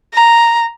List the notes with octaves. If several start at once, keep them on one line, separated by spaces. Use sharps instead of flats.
A#5